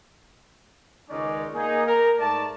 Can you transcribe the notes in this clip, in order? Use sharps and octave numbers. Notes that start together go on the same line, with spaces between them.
C#2 D#3 G#3 C#4 D#4 D5
A#3 D#4 G#4
A#4 A#5
G#2 A3 D5 A5